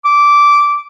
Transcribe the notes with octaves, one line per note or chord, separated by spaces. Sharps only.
D6